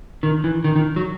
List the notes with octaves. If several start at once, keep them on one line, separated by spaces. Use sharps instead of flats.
D#3
E3
D#3
D#3
F#3